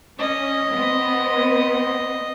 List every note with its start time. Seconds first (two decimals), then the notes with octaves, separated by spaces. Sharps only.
0.19 C#4 D#5
0.69 B3 C4